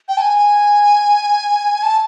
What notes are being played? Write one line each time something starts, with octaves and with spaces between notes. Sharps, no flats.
G5
A5
G#5
A5